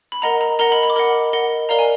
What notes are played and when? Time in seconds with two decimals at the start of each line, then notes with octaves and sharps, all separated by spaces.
0.12 B5
0.22 A#4 D#5 F#5 A#5
0.41 A#5
0.59 A#4 D#5 F#5 A#5
0.72 B5
0.83 B5
0.90 D6
0.96 A#4 D#5 F#5 B5
1.33 A#4 D#5 F#5
1.69 A#4 D5 F5 A#5
1.79 G#5